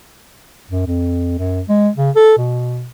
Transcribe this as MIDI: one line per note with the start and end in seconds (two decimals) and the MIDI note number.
0.71 0.85 42
0.87 1.34 41
1.38 1.61 42
1.69 1.89 56
1.97 2.11 49
2.16 2.38 69
2.38 2.89 47